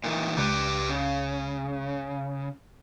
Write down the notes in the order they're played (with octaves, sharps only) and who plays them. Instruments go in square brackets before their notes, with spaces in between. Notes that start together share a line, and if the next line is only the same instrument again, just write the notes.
[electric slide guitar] A#2 D#3 E3
[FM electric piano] C#2 [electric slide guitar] G4 B4 D5
[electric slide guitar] C#3